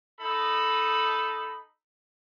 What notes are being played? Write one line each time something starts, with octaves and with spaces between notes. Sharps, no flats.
D#4 A4 B5